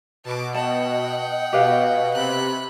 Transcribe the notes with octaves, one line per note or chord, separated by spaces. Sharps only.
B2 A5 D6
D#5 F#5 G5 A5
B2 G4 B4 F5
C3 B5 F#6